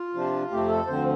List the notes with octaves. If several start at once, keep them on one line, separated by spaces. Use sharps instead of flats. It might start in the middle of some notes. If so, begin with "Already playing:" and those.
Already playing: F4
C3 F3 D4
F2 C3 F3 A3 C4 G4
A4
D2 D3 F3 C4 C5